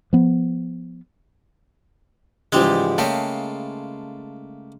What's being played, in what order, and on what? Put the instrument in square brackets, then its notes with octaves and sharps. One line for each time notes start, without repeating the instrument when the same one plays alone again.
[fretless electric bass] F3 B3
[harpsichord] G#2 G4 [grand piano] C#3 E3 F3 [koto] G3 G#3
[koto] C#3 [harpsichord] A3 A#3 G5 [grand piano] A5